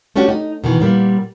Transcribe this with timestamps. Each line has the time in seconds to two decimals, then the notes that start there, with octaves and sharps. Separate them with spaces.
0.16 A3 C#4 D4 F#4 G4
0.29 D#4
0.64 B2 D#3 E3
0.80 A#2 G3 A#3 B3